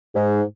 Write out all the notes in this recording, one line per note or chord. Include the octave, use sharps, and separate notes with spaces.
G#2